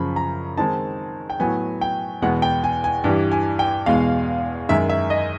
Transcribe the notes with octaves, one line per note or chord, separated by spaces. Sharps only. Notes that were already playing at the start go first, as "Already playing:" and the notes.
Already playing: F#2 C#3 F3 B5
A#5
D#3 G#3 C4 D#4 A5
G5
A2 F#3 B3 G#5
G5
E2 B2 G#3 B3 F#5
G5
G#5
G#5
G2 E3 G3
G#5
G5
E2 B2 G#3 F5
F#2 D#3 G#3 E5
E5
D#5